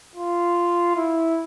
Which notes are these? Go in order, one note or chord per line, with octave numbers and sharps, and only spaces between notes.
F4
E4